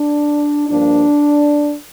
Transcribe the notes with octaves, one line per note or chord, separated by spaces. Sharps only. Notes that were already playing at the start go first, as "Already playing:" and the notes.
Already playing: D4
G2 F3 A#3 D4